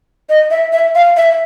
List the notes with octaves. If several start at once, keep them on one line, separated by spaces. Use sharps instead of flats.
D#5
E5
E5
F5
E5